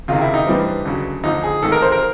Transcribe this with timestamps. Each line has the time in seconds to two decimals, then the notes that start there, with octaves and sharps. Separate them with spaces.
0.08 C#2 C3 D#3 F4
0.21 E4
0.34 D#4
0.47 G2 E3 G3 C4
0.85 D2 C#3 F#3
1.24 D2 D3 F3 D#4
1.44 G#4
1.63 G#2 D#3 G#3 A4
1.72 A#4
1.82 C5
1.92 A#4